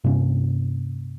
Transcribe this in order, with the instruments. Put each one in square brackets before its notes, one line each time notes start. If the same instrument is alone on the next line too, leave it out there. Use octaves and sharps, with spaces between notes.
[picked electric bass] G2 C3 A#3 C#4